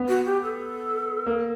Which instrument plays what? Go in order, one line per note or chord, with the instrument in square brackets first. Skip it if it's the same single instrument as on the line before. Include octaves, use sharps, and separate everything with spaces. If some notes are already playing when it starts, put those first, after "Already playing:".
Already playing: [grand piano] B3
[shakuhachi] F#4
G4
A4
[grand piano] A#3